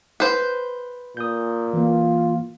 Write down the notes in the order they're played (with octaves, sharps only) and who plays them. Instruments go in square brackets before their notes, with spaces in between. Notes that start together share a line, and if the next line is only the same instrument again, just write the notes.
[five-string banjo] B4 C5
[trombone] A#2 [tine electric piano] D#6 G6
[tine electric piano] E3 A#3 [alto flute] F4